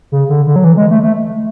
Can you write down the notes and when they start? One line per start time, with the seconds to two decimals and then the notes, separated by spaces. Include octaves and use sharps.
0.12 C#3
0.29 D3
0.47 D3
0.56 F#3
0.64 E3
0.77 G#3
0.91 A3
1.03 A3